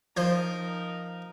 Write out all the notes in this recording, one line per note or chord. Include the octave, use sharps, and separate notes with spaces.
F3 D#4 A#4 C5 G6